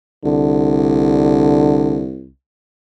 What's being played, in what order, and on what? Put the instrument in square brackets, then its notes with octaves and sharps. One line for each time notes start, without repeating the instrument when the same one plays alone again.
[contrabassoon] C2 [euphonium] D3